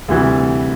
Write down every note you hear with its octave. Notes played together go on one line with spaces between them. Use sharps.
D2 C3 E3 G3